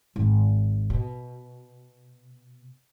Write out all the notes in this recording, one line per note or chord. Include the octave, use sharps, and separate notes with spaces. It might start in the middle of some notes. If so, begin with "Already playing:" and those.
G#1
B2